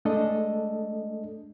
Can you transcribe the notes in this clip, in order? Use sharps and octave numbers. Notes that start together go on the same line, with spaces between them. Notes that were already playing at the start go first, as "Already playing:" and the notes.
G#3 A3 D4 A4 D#5